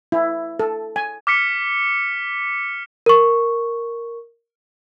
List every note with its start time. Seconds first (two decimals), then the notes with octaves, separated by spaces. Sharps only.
0.12 E4
0.59 A4
0.96 G#5
1.27 D6 F6 B6 C#7
3.06 A#4 C#6